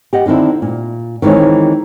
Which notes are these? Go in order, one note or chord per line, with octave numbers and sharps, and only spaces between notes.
G4 D#5 F#5
D3 D#3 C4 D4 E4
A#2
D#3 E3 G#3 C4 C#5